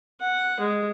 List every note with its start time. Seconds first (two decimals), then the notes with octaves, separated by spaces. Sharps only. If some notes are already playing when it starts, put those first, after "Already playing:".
0.20 F#5
0.60 G#3